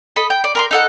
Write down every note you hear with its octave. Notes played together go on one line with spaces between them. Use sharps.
A4 D#5 B5
G5
D5
A#4 B5 C6
D#4 A4 F#5